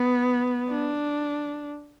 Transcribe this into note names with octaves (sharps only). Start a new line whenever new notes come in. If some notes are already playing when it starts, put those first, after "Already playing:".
Already playing: B3
D4